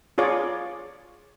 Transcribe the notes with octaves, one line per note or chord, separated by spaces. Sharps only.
F4 G#4 C#5 D5